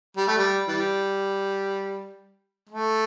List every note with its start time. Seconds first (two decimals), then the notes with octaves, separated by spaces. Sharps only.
0.17 G3
0.28 A3
0.38 G3
0.67 E3 G3
2.69 A3